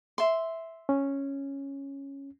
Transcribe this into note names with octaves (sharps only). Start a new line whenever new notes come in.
E5 C6
C#4